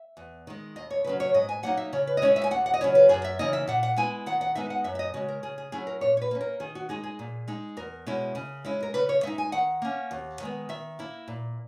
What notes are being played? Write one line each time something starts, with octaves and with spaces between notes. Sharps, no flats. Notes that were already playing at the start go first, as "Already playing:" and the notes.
Already playing: E5
E2
D#3 G#3
D#2 D#5
C#5
C#3 F#3 C#4 B4
C#5
G#2 D#5
G#5
F#3 A#3 D#4 F#5
E5
C#3 C#5
B4
D#5
G#3 C#4 E4 C#5
E5
G#5
D#2 F#5
F#5
D#5
C#3 F#3 C#4 E4 C#5
B4
F#2 G#4
E5
C#3 E3 A#3 D#4 D#5
E5
A#2 F#5
F#5
G#3 B3 E4 G#5
D#3 F#5
F#5
G#3 B3 D#4 E5
F#5
F#2 E5
E5
D#5
C#3 G#3 F#4
A#4
C#3 G#4
G#4
F#3 C#4 E4 G#4
A#4
A#2 C#5
C#5
B4
A#3 C#4
A#4
D#3 G#4
F#4
G#3 D#4 G#4
G#4
A#2
G#3 D#4
E2 A#4
B2 G#3 C#4 E4
C#3
G#3 C#4 E4
A#4
C#3 B4
C#5
G#3 D#4 E5
G#5
D#3 F#5
A#3 C#4
D#2
D#3 G#3 B3
D#3 E5
A#3 E4
A#2